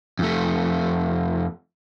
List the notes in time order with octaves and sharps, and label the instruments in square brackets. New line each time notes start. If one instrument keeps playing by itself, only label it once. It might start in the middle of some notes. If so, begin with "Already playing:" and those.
[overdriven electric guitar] F2 A3